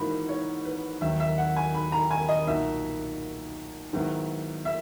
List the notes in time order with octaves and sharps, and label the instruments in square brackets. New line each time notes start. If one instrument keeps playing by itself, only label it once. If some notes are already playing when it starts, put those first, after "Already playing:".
Already playing: [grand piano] G#2 E3 A#3 D#4 F#4 [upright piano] B5
[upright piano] C#5
B4
[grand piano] D#2 D#3 F#3 [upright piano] E5
[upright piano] E5
F#5
G#5
B5
A#5
G#5
D#5
[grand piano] B1 A#2 A#3 D#4 F#4 [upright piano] E5
[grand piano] G#2 D#3 F#3 B3 E4
[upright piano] E5